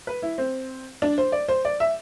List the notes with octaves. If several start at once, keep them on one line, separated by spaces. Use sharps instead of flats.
B4
E4
C4
D4
C5
D5
C5
D5
E5